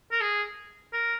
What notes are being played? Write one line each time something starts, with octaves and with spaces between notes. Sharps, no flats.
A#4
G#4
A#4